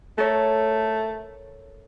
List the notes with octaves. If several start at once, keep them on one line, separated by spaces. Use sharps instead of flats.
A3 A4 A#4 C#5